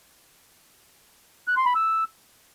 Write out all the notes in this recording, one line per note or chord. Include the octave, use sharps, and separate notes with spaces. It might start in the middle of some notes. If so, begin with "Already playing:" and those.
F#6
C6
B5
E6